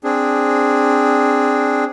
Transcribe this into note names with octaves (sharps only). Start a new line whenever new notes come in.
C4 D4 G#4